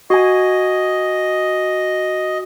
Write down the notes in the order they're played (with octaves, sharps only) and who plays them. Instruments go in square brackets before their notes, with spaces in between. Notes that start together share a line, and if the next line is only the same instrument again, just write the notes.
[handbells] F#4 G#5 [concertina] D#5